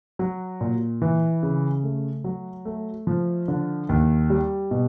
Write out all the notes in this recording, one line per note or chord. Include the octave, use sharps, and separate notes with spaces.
F#3
A#2
E3
C#3
A3
F#3
A3
F3
D3
D#2
G3
B2